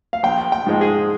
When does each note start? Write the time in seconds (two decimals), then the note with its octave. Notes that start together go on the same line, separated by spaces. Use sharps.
0.13 F5
0.23 A#1 G5
0.52 G5
0.66 G#2 F3 G#3
0.81 G#4